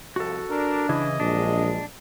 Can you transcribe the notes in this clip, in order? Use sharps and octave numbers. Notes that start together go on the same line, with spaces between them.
C2 F2 F3 F#4 A4
D4 A#4
C#3 E3 E4 D#5
A#1 F2 F#3 G#3 D4